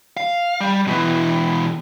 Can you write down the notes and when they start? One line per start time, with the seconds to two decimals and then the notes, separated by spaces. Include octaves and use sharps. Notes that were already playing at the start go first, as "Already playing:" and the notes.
0.17 F5
0.61 G3
0.87 B2 E3